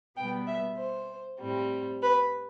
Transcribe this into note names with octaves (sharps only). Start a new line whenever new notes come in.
B2 G3 B3 G5
E5
C5
A2 G3 C4
B4